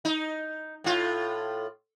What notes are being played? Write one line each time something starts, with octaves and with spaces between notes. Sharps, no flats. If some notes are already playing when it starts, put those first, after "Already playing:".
D#4
A2 F4